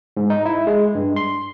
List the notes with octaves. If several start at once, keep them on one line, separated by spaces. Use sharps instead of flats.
G#2
D#4
E4
G#3
G2
C6